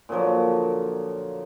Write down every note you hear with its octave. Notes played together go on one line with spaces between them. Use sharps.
A#2 D3 F3 F#3